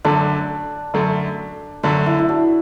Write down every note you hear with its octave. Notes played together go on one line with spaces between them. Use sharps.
F#2 D3 A3 D4
F#2 D3 A3
F#2 D3 A3 D4
E4
E4
D4 F#4